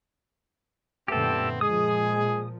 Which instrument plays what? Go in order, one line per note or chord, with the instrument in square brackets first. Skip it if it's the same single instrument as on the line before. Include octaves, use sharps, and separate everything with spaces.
[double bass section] F#2 A#2 D3 [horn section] A3 B3 C4 [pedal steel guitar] G4 A4
[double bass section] A#2 F3 [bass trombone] G#3 [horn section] G#4 [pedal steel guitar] D#6